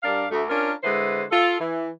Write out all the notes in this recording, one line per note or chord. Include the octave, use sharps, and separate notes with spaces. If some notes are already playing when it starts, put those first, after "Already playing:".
G2 D4 A#4 D5 F5
D2 A3
C#4 D4 F4 A#4
D3 G#3 E4 B4 C5
F4 A4
E3